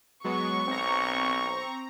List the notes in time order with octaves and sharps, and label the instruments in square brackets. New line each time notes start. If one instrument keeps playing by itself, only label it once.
[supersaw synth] F#3 G#3 B3 [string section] C#6
[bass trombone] B1 [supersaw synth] C4 A#5